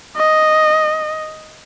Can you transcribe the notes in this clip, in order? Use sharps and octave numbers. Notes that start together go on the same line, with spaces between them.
D#5